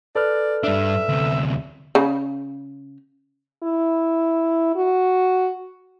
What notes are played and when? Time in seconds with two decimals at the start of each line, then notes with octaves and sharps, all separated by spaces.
0.15 A4 B4 D5 F6
0.63 G2 D4 E5
1.09 D2 C3
1.95 C#3
3.63 E4
4.76 F#4